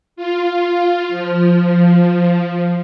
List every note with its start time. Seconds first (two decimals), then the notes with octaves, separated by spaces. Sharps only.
0.16 F4
1.09 F3